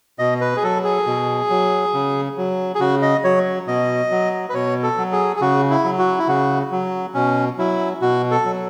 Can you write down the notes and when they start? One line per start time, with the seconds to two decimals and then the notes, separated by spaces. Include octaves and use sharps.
0.19 B2 D#5
0.41 B4
0.57 G#4
0.63 F#3 A4
0.84 G#4
1.06 B2
1.50 F#3
1.93 C#3
2.37 F#3
2.75 G#4
2.80 C#3 F#4
3.02 D#5
3.24 F#3 C#5
3.67 B2 D#5
4.11 F#3
4.49 B4
4.54 B2 C#5
4.83 A4
4.98 F#3
5.12 G#4
5.36 G#4
5.41 C#3 F#4
5.70 E4
5.84 F#3
5.99 F#4
6.19 E4
6.28 C#3 F#4
6.71 F#3
7.14 B2 C#4
7.58 F#3 E4
8.02 B2 F#4
8.31 A4
8.45 F#3